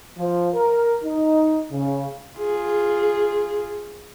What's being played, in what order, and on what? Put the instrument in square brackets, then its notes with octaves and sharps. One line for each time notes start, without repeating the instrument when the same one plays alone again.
[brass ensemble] F3
A#4
D#4
C#3
[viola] F4 G#4